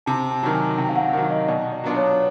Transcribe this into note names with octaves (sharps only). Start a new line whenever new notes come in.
C3 A5
A5
D#3 F#3
G#5
C3 G5
F5
F#5
D#3 F#3 F#5
D#5
B2 D5
D5
F#3 B3 D4 F4
C#5